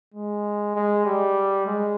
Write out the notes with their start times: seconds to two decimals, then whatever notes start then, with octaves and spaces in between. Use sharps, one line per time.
0.14 G#3
0.76 G#3
1.06 G3
1.66 G#3